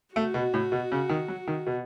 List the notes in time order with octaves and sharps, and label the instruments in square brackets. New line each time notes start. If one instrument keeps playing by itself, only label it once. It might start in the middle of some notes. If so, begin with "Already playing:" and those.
[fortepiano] A3 [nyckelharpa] F#4
[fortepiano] B2
A2
B2
C#3
D#3
F#3
D#3
B2